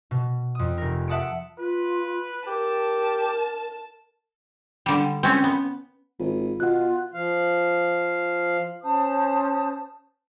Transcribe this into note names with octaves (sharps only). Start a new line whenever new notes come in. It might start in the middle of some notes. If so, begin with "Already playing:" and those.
B2
F2 D#6
F1 A#4
E5 F#5 A5 D#6 C#7 D7
F4 B4
G4 A#4 A5
D3 G3
C4 C#4
B3
G#1 F4
B2 F4 F#5 F#6
F3 F5
C#4 C5 A5 D#6